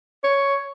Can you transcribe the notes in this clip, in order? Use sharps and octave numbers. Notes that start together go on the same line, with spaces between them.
C#5